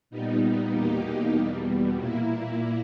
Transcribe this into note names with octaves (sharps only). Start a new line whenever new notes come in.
A#2 G3 B3 D#4
E2 B2 A#3 D#4 G4
E2 B2 G3
A#2 A#3 E4